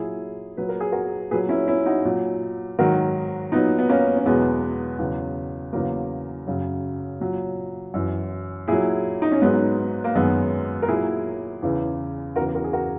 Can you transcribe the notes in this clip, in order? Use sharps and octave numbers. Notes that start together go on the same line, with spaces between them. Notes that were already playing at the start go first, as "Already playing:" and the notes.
Already playing: A#2 F#3 E4 G#4
A#2 F#3 B4
A#4
G#4
F#4 A#4
A#2 F#3 G#4 B4
C#4 E4
C#4 E4
D#4 F#4
A#2 F#3
G#2 D#3 F#3 F#4 A#4
A#2 F#3 B3 D#4
B3
A#3 C#4
C#4
E2 B2 F#3 G#3 B3
E2 C#3 F#3
E2 C#3 F#3 A#3
F#2 C#3 F#3
A#2 F#3
F#2 E3
A#2 F#3 E4 G#4
D#4
C#4
G#2 F#3 G#3 B3
A#3
F#2 D#3 F#3 G#3 B3
A#4
A#2 F#3 E4 G#4
E2 C#3 E3
E2 C#3 E3 F#4 A#4
F#4 A#4
G#4
F#4 A#4